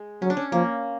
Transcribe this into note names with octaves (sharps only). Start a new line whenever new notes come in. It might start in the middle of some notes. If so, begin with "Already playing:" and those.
Already playing: G#3
F#3 C#4
D4
C#4
F3 A#3